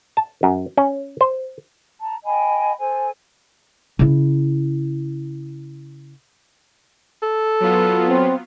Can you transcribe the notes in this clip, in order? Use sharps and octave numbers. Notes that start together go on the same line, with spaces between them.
A5
F#2
C#4
C5
A5 A#5
D#5 G5 G#5 B5
A4 C5 G#5
C#3 E4
A4
F#3 B3 F4
C4